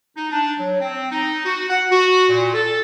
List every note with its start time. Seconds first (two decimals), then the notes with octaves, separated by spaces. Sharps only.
0.15 D#4
0.31 D4
0.59 F#3
0.80 C4
1.10 D#4
1.45 F#4
1.69 F#5
1.90 F#4
2.30 A#2
2.54 A4